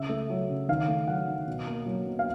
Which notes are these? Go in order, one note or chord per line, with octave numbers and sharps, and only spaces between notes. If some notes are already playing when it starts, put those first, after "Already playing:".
Already playing: C#3 E5
A3
F#3
C#3
D#3 F5
A3
F#3 F#5
D#3
B2
A#3
F#3
B2
F5